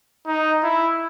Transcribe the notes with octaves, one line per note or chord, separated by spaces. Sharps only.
D#4
E4